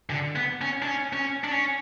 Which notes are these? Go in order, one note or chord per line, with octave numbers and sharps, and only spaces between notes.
D3
B3
C#4
D4
C#4
C#4
D4
C#4